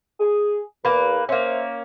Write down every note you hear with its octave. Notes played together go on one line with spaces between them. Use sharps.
G#4
E2 A#3 B4
A#3 C#4 C5 E5